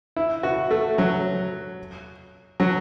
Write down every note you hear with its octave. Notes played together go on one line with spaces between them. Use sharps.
E4
F#4
A3
F#3
F#3